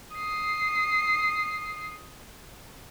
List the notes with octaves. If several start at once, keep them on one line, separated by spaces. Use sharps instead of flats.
D#6 C7